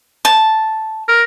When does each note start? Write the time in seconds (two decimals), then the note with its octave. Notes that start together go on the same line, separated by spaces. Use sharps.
0.25 A5
1.09 A#4